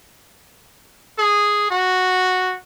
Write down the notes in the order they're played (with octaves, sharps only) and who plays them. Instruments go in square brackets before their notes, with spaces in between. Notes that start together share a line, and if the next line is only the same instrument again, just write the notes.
[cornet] G#4
F#4